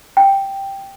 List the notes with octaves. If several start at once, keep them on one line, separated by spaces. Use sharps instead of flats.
G5